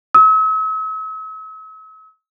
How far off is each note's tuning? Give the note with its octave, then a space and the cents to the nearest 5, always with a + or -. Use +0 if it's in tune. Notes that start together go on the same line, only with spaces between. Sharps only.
E6 -45